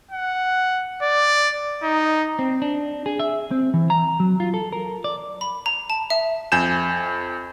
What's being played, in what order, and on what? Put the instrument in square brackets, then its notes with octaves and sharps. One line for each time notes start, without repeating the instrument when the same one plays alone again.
[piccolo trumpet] F#5
D5
D#4
[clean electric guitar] C4
D4
G#4
E5
C4
E3
A#5
F#3
F4
A4
A#4
D5
[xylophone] B5
A#5
A5
E5
[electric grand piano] F2 G#5 G6 E7